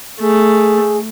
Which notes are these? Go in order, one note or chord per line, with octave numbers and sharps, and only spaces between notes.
A3 G#4